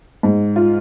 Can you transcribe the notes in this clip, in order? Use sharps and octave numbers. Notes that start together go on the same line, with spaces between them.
G#2
F4